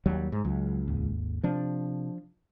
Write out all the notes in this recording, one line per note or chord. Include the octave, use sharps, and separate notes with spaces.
D#2 F#3 G3
G#2
C#2 F#3
G#1 D#2
C3 F3 D4